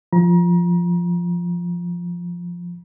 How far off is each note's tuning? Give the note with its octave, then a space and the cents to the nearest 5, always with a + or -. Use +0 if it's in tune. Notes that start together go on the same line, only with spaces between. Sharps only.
F3 +0 A#5 +35